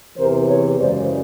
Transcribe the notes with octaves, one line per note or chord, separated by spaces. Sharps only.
E2 C3 E3 A#4 C5
B4 C#5
F#2 C#3 E3 G#3 C5 D5